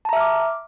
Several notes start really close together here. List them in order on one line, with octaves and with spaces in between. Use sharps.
A5 A#5 E5 F6 D6